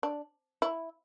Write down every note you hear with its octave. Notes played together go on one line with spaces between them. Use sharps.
D4
E4